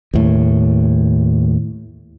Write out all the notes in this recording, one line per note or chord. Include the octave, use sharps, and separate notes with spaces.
D#2 A2